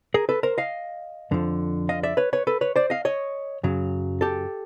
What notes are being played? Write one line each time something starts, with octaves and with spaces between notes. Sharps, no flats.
G#4 A#4
A4 B4
A#4 C5
D#5 F5
F2 D3 F3
D#5 F5
D5 E5
B4 C#5
B4 C#5
A4 B4
B4 C#5
C5 D5
D#5 F5
C#5 D#5
F#2 C#3 F#3
G4 A4